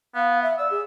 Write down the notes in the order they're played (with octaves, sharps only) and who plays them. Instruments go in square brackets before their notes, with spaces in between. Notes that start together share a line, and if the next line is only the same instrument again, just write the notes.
[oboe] B3 [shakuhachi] F5
[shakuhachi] E5
[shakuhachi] D5 [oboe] E6
[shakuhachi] G#4